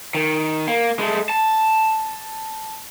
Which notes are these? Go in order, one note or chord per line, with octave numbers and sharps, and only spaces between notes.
D#3
A#3
G#3 A3
A5